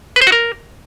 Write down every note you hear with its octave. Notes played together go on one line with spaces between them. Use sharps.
B4
C5
F#4
A#4